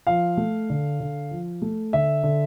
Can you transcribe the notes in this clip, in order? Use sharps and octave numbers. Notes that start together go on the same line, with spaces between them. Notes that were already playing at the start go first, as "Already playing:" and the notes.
F3 F5
A3
D3
D3
F3
A3
D3 E5
D3